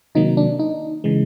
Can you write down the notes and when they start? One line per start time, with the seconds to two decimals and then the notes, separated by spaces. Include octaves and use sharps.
0.15 C3 D#3 F#3 A#3 D#4
0.37 D4
0.59 D#4
1.04 C#3 E3 G#3